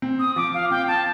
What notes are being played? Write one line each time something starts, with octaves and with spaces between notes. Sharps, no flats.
C4
D#6
F3 D6
F5
C4 G5
A5